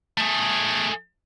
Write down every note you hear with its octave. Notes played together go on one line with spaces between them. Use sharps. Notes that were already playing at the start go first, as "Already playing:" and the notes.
A3 G#4